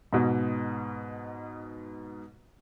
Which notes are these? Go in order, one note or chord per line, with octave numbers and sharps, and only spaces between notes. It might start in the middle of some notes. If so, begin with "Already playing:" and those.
G#2 B2